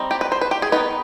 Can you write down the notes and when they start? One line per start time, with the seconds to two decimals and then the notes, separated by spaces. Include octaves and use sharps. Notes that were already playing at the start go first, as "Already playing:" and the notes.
Already playing: G3 C4 D#4
0.11 G4
0.21 B4
0.32 C5
0.41 B4
0.51 G4
0.62 G#4
0.72 D#3 B3 D#4 B4